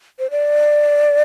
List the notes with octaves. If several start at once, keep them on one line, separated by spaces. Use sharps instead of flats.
C5
D5